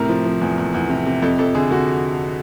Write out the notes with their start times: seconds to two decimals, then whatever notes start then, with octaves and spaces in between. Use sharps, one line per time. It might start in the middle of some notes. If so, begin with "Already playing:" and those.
Already playing: A2 C3 A#4
0.09 F3
0.25 F3
0.41 E2
0.58 E2
0.74 E2
0.89 C3
1.06 C3
1.22 F2 A4
1.39 F2 A4
1.55 D3 G#4
1.71 D3 F#4